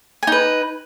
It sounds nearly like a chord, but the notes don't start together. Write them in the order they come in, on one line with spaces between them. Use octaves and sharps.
G#5 D#4 B4